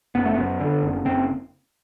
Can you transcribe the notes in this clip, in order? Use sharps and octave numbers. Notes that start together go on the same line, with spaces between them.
F#1 B3
A3
F#2 B3
D3
F#1
F#1 C4